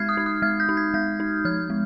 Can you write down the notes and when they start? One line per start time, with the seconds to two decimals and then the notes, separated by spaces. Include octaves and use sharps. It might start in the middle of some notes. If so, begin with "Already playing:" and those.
Already playing: G#3 D#4 F6 G#6 C7
0.09 D#6
0.17 D#4
0.26 D#6
0.42 G#3 F6
0.60 G6
0.69 D#4
0.77 G#6
0.94 G#3 G6
1.20 D#4
1.45 F3 F6
1.70 G#3